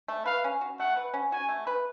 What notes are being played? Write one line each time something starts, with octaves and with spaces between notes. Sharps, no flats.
A3
B4 F5
C#4
F#4
A3 F#5
B4
C#4
F#4 G#5
A3
B4